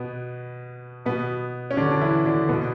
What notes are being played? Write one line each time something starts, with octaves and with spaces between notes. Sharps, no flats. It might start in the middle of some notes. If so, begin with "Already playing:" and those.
Already playing: B2 B3
B2 B3
C#4
D3 D4
D4
E3 E4
D3 D4
B2 B3